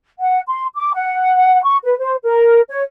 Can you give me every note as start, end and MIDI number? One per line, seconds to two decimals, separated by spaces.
0.19 0.40 78
0.48 0.66 84
0.76 0.92 86
0.94 1.63 78
1.63 1.76 85
1.84 1.96 71
1.99 2.15 72
2.23 2.60 70
2.69 2.81 73